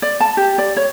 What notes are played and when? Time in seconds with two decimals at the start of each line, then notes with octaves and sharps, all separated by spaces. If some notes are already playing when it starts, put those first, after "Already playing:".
0.02 D5
0.21 A5
0.37 G4
0.58 D5
0.77 C#5